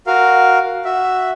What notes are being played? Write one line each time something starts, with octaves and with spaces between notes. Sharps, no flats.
F#4 A#4 F5
F#4 E5